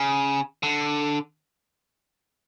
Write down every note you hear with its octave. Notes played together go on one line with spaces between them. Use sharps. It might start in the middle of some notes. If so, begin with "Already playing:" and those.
Already playing: C#3
D3